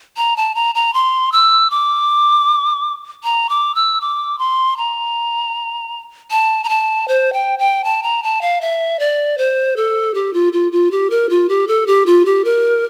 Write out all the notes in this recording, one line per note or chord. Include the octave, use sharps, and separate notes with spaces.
A#5
A5
A#5
A#5
C6
E6
D6
A#5
D6
E6
D6
C6
A#5
A5
A#5
A5
C5
G5
G5
A5
A#5
A5
F5
E5
D5
C5
A4
G4
F4
F4
F4
G4
A#4
F4
G4
A4
G4
F4
G4
A#4